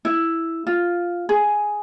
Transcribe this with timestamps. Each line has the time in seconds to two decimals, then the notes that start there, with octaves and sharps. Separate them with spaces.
0.05 E4
0.67 F4
1.29 G#4